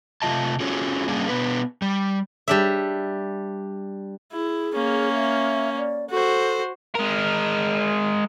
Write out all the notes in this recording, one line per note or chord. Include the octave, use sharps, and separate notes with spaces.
C3 A3 A#3 F4 D#5 A5
C#4 F4 F#4 G#4 A4 C#5
G3 A#3 C#4 D4 G#4
B2 B3 D4 B4
G3
G3 D4 E5
E4 G#4
A#3 C#4
E5
D5
F#4 A4 C5
G#3 A#4